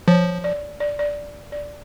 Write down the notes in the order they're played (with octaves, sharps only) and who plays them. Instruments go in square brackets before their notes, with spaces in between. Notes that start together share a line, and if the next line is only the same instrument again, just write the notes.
[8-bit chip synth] F3 [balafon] C#5
[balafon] D5
D5
D5
D5